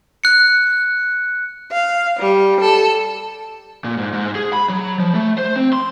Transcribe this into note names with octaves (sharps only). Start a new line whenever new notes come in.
F#6 C#7
F5
G3
A4
A#2
G#2
G#2
G#4
B5
F#3
F3
A3
C5
C4
C6